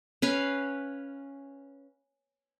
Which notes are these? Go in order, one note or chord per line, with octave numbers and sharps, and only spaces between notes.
C#4 B4 F5